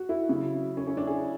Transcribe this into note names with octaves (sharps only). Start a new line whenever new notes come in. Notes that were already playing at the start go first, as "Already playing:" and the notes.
Already playing: F#3 F#4
E4
C#3 F#3
C#4
C#4
D4
G#4